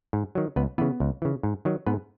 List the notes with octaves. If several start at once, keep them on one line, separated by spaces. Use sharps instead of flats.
G#2
D#3 F#3
C#2 B3 B4
C#3 E3 B3 B4
C#2
C#3 E3
G#2
D#3 F#3
G#2 B3 B4